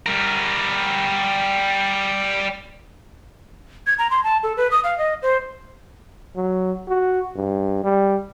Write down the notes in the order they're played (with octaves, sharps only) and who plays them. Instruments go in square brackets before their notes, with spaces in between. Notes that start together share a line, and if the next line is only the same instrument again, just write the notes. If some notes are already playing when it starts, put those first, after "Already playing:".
[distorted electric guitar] G3 A#4
[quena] G#6
A#5
C6
A5
A4
B4
D#6
F5
D#5
C5
[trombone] F#3
F#4
G2
G3